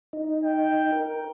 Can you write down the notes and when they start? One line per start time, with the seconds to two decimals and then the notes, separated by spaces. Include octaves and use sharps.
0.13 D#4
0.43 G5
0.92 A#4